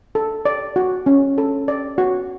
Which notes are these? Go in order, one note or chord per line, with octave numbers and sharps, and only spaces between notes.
A4
D5
F#4
C#4
A4
D5
F#4